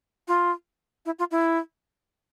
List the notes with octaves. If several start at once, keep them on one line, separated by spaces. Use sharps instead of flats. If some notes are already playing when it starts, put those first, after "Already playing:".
F4
E4
F4
E4